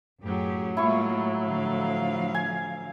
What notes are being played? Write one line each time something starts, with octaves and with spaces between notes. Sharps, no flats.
F#2 A2 F#3 G4 G#4
G#3 A#3 E4 F4 C#6
D3 F3 F5
G#5